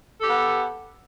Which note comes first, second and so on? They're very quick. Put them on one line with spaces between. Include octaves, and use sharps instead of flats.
A4 G4 B3